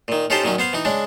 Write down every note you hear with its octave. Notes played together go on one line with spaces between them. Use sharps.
A#2 D#3
C#4 D#4 F4 G4 A4 C5
A#2 D#3 F#3 C#4
B3 C5 F5
E3 D#4
C#3 G#3 D4